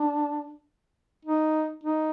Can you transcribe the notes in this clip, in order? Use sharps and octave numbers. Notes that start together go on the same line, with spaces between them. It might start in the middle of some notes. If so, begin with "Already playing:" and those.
Already playing: D4
D#4
D#4